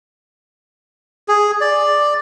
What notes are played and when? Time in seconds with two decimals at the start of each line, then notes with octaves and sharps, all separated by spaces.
1.28 G#4
1.61 D5